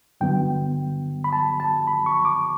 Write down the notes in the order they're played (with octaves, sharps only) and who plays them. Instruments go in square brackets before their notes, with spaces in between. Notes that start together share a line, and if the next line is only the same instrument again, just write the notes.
[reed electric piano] G2 D3 F#3 B3 G5
B5
A5
A5
B5
C#6
D6